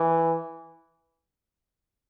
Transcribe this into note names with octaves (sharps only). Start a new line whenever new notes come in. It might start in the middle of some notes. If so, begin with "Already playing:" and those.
Already playing: E3